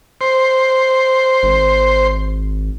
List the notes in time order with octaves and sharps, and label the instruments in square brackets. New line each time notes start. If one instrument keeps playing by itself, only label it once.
[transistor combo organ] C5
[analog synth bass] G#1